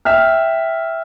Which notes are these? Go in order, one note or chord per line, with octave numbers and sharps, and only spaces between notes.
E5 G5 F6